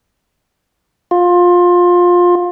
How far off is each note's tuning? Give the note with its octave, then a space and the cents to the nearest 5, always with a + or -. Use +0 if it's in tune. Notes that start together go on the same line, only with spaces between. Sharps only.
F4 +20